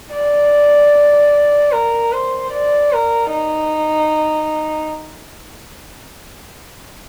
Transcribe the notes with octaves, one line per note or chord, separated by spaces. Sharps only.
D5
A#4
C5
D5
A#4
D#4